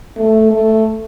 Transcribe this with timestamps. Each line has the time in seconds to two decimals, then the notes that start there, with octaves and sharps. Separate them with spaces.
0.17 A3
0.51 A3